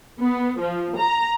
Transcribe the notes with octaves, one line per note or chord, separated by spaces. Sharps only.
B3
F3
A#5